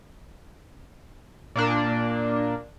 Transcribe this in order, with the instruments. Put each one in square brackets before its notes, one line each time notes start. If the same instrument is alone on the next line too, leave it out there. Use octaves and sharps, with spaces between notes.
[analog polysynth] A#2 A#3 D4